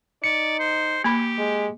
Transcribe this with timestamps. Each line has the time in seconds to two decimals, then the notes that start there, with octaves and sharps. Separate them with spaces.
0.24 D#4 D5 C#7
0.60 C5
1.04 A#3 G4 B5
1.38 G#3